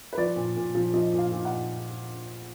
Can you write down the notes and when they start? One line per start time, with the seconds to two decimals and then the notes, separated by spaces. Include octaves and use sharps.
0.13 B4
0.18 F3 D5
0.36 A#2
0.56 A#2
0.75 F3
0.94 F3 D#5
1.13 A#2
1.19 F5
1.32 A#2
1.45 F#5